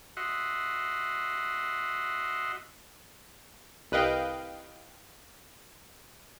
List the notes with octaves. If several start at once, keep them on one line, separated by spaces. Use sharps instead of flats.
F#4 D#5 E5 F#5 C6
C2 B4 D#5 F5 G5